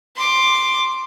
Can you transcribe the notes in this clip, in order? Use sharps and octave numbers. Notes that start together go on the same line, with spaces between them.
C6 D6